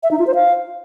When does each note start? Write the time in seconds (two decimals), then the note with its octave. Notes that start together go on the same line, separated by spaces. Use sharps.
0.03 E5
0.11 D#4
0.19 F4
0.27 C5
0.35 F5